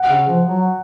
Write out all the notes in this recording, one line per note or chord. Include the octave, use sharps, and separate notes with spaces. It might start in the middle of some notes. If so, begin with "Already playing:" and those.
Already playing: F#5
C#3
F3
F#3